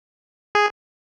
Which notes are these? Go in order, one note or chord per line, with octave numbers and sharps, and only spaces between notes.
G#4